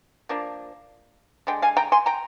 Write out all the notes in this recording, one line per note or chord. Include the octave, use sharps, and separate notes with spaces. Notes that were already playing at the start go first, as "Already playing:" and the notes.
F3 A#3 D4
D3 G#3 G5
F5 G#5
G5 A#5
G#5 C6
G5 A#5